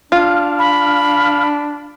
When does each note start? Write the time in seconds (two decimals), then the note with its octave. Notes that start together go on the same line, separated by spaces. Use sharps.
0.12 D4 F4 F5
0.59 B5